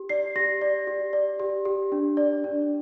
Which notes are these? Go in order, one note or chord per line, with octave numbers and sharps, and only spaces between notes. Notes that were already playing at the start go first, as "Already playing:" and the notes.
Already playing: G4
D5 C7
G4 A#6
D5
G4
D5
G4
G4
D4
D5
D4